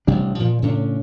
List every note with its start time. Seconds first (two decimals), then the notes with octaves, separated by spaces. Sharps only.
0.07 A1 C3 G3 D4
0.40 A#2 F3
0.62 A2 C#3 C#4 D4